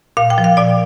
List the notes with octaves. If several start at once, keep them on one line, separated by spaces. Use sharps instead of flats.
A#2 F5
G5
F3
F5
A#2 D5